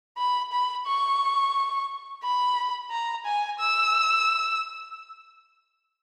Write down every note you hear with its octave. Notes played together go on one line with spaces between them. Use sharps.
B5
B5
C#6
B5
A#5
G#5
E6